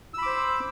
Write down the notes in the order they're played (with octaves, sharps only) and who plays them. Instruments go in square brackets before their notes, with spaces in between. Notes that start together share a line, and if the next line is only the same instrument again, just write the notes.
[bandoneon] E6
B5
D6
C5